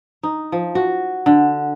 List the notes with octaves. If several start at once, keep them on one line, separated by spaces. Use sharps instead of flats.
D#4
F3
F#4
D3